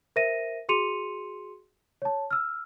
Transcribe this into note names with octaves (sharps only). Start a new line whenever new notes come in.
A#4 C5 E5 A#6 D#7
F#4 G#4 C6 C#7 D#7 F7
C#5 A5
E6 F6